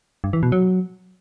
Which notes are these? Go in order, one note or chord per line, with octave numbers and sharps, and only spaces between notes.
G2
E3
B2
F#3